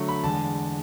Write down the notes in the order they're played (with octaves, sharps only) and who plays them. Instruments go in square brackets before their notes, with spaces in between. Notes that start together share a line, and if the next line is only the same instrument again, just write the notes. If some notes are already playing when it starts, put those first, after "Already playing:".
Already playing: [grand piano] D3 F#3 A3 C#6
B5
E2 D3 G#3 A5